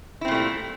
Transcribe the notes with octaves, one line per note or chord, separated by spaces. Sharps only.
A#2 G3 A3 C4 E4